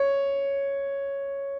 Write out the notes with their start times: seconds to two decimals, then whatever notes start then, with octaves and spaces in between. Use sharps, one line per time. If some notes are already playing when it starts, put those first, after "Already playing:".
Already playing: C#5